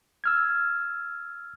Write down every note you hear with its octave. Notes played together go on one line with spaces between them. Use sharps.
E6 F6 G#6